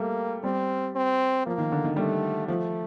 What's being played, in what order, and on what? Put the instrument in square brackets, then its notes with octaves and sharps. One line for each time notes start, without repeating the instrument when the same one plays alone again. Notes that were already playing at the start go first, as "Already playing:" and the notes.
Already playing: [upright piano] G3 A3 [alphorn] A#3
[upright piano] G3 [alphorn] C4
[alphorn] C4
[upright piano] F3 [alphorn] A#3
[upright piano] D#3
D3
D#3
[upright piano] G3 [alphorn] A3
[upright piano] F3 [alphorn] A3